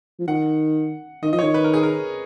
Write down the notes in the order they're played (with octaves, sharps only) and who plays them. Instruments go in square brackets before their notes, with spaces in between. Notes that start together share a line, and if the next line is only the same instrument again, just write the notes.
[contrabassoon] F3
[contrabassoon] D#3 [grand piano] F#5
[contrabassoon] D#3 [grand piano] D#5
[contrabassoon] F3 [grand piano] D#5
[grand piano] C#5
[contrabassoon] D#3
[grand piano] B4
A#4
G#4
A#4